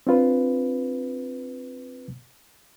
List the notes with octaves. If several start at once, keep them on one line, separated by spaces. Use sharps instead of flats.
C4 D4 F4 B4